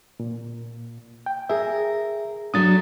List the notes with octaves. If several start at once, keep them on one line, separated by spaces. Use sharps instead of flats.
A#2
G5
G#4 A#4 E5
F#3 A3 D4 D#6 A6